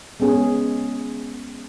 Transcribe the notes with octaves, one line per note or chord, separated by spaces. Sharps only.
G#3 B3 C#4 G#4